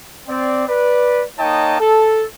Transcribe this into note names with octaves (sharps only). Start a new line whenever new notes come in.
C4 D5
B4 D5
A#3 D#4 C#5 D#5 G5 A5
A4